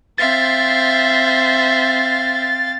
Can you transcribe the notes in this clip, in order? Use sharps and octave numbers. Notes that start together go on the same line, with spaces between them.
C4 C5 E5 F5 A6